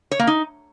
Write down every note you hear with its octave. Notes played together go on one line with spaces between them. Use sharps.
C#5
A#3
D#4